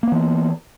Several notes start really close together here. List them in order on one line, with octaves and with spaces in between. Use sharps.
A#3 B3 E3